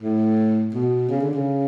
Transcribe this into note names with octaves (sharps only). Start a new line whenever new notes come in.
A2
B2
C#3
D3
C#3